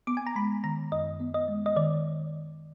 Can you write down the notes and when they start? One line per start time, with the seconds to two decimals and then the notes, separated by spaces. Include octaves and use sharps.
0.07 B3 D6
0.17 G#5
0.27 A#5
0.35 G#3 B5
0.64 D#3 A#5
0.92 F#2 D#5
1.20 B3
1.34 D#5
1.48 G#3
1.66 D#5
1.76 D#3 D5